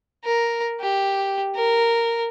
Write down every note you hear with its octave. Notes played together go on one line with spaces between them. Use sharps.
A#4
G4
A#4